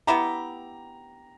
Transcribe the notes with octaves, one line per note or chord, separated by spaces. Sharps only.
B3 E4 G4 A#5